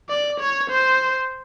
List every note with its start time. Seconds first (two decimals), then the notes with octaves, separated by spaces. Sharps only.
0.09 D5
0.40 C#5
0.70 C5